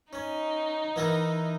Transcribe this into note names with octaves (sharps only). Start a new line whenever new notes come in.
C#4 D#4
E3 B3 A#4